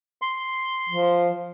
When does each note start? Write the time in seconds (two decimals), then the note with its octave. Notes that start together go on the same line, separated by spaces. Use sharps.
0.22 C6
0.89 F3